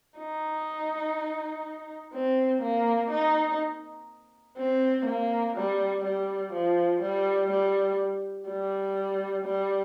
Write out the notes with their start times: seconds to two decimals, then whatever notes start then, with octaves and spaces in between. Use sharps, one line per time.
0.18 D#4
2.14 C4
2.62 A#3
3.11 D#4
4.58 C4
5.06 A#3
5.56 G3
6.05 G3
6.53 F3
7.02 G3
7.51 G3
8.48 G3
9.45 G3